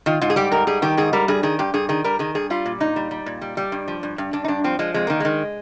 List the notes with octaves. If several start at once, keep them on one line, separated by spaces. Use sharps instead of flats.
D#3 F4
G#2 F4
G#4
G3 G4
G#2 A#4
G3 G#4
D#3 G4
G#2 G#4
G3 A#4
G2 G#4
D#3 G#4
G2 G4
G2 G#4
D#3 G#4
G3 A#4
D#3 G#4
G2 G#4
G3 F4
A#2
A#2 D#4
G3
G3
A#2
G3
G3
G2
F3
G2
G2
G2 D4
D#4
G2 D4
F3 C4
F3 G#3
F2 G#3
D#3 A#3
D#3 G#3